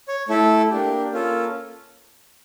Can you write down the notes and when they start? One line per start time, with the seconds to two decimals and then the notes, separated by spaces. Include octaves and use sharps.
0.08 C#5
0.29 A3 E4 A4
0.71 A#3 D4 G4
1.12 A#3 C#4 F4 A4